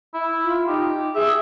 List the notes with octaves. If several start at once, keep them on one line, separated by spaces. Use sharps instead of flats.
E4
F4
D#4 G4
G#4 E5